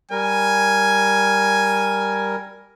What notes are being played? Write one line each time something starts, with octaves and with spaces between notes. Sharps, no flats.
G3 A#4 G#5